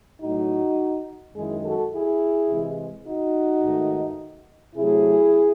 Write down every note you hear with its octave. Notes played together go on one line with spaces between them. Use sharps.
A2 F#3 A3 D#4 F#4
F#2 D#3 G#3 E4 G#4
F#4 A4
E4 G#4
C3 E3 G#3
D#4 F#4
G#2 D#3 A3
C3 F#3 A3 E4 G#4